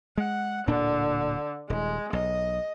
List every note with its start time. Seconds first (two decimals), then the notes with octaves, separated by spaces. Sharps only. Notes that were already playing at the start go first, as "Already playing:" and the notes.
0.18 G#3 F#5
0.67 D1 A#2 D3 D4
1.70 D#1 G#3
2.13 B1 D#5